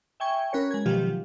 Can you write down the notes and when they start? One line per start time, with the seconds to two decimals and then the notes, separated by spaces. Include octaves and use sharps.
0.20 E5 G5 G#5 C#6 G#6
0.53 C#4 F#4 A#4 B4 C#5
0.71 G#3 G#6
0.85 B2 D#3 F3 F#3 F4 G4